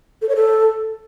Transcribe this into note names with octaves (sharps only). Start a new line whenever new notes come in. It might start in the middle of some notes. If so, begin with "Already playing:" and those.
A4
C#5
A4